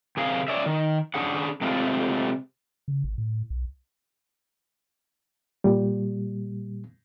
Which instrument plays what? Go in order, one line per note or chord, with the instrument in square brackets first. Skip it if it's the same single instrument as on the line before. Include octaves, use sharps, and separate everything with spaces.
[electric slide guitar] C3 G#4 A#4 F5
C#4 C#5 D5 E5
D#3
C#4 D4 G#4 F#5
C3 G#3 A3 C4 F4
[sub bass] C#3
G#1
A2
B1
[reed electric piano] A#2 G3